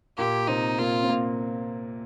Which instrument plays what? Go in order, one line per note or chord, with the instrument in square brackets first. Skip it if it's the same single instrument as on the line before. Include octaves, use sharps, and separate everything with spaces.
[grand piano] A#2 A#3 [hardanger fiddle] G4
[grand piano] C3 C4 [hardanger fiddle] D#4
[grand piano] A#2 A#3 [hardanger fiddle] F4
[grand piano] C4
A#2 A#3